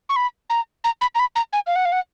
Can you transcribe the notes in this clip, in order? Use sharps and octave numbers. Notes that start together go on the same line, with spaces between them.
C#6
B5
A#5
A#5
B5
A#5
B5
A#5
G#5
F5
F#5
F5
F#5